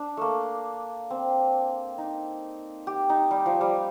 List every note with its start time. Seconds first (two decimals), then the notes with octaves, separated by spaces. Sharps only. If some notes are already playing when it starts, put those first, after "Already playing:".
Already playing: D4
0.17 A3 A#3
1.11 C4
1.98 D#4
2.87 G4
3.09 D#4
3.31 G3
3.46 F3
3.61 G3